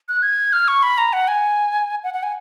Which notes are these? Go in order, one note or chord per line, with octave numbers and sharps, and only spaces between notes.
F#6
G#6
F6
C#6
B5
A#5
F#5
G#5
F#5
F#5
G#5